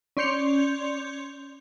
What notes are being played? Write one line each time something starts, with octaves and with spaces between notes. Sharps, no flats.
C#4 D5 C6 G6 C#7 F7